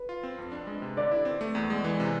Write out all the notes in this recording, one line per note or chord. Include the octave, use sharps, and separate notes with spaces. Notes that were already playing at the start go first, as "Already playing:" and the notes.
Already playing: B4
F4
C4
F2
D4
G#3
C3
D3 D5
E4
C4
A3
E2
G#3
E3
C3